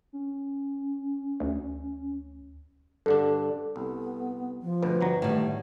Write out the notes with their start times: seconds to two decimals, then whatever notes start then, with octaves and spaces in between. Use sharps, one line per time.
0.13 C#4
1.40 D2
3.06 G2 D3 D4 A4
3.76 C2 B3
4.62 F3
4.83 D2 B2 B4
5.01 G1 F#3 A#5
5.22 A2 D#3 G3